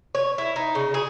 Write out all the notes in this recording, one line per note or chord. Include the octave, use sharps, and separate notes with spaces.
C#5
E4
D#4
C#3
G#4